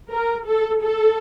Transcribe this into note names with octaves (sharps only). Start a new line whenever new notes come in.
A#4
A4
A4